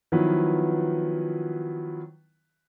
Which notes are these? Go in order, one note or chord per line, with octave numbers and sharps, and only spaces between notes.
D#3 F3 F#3 B3 E4 B4